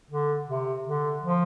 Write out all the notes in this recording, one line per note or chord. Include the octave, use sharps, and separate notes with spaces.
D3
C3
D3
F3